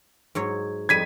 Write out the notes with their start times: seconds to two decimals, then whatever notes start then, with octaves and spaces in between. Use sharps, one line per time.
0.35 G#2 F#3 C#5
0.89 F2 G3 D#4 G#6 B6 D#7